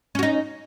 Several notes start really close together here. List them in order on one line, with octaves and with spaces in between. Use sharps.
C#4 F#4 D#4